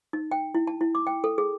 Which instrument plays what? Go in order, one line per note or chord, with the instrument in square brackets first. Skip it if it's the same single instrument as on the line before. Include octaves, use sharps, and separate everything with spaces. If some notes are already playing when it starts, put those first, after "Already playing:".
[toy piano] D#4
G5
E4
A5
E4
D6
G5
A4
G#4